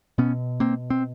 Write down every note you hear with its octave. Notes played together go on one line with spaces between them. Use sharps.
B2 B3 C#4
A#3 C4
C4